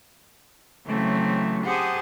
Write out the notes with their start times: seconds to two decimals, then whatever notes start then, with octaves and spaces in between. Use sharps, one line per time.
0.86 C#3 E3 F#3 A3 C4
1.64 G4 G#4 C5 F#5 A5 D#6